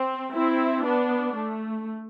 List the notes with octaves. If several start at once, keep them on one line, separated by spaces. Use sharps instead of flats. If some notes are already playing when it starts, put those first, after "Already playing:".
Already playing: C4
C4 E4
B3 D4
A3